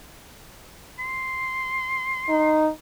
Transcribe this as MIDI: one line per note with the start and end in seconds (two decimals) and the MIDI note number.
0.99 2.60 84
2.29 2.69 63